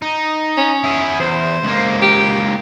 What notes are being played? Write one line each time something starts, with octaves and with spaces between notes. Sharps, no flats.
D#4
C#4
E4 G#4
E2 C5
C#2 A#3
G4